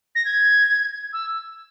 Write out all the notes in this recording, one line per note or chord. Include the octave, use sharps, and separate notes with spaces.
A#6
G#6
E6